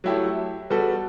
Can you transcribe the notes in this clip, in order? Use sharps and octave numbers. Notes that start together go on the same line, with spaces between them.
F#3 A3 E4 G4
G3 B3 F#4 A4